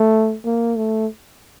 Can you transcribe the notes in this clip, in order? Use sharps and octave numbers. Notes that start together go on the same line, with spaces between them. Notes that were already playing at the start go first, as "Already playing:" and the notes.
Already playing: A3
A#3
A3